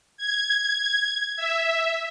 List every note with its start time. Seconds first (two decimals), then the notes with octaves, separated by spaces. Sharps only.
0.17 G#6
1.36 E5